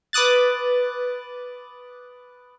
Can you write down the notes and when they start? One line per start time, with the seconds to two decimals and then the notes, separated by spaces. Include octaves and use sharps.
0.13 B4 D6 D#6 F#6 A6